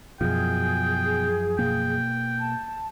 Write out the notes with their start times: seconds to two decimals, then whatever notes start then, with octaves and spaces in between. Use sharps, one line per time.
0.21 F#2 B2 F3 G#4 G5
1.58 B2 A#3 G5
2.39 A5